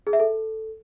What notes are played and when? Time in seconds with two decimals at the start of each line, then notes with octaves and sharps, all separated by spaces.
0.07 G#4
0.13 E5
0.20 A4